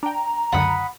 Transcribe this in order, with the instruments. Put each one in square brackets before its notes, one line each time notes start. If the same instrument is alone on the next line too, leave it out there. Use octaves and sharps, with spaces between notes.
[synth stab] D4 G5 [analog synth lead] A#5
[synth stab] C#2 F#2 D3 [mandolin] F#5 B5 D#6